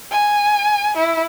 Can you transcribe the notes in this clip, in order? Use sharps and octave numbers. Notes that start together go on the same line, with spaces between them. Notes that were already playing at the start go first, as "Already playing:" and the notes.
G#5
E4